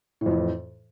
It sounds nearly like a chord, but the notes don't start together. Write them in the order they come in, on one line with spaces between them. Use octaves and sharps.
A2 F2 E3